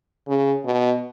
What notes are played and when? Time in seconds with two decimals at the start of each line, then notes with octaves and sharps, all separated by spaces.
0.27 C#3
0.65 B2